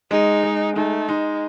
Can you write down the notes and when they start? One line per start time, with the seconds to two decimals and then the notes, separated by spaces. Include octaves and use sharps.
0.11 G#3 D#4
0.43 G#3
0.76 A3 D#4
1.09 G#3 D#4